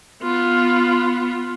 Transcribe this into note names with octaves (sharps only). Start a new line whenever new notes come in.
B3 F4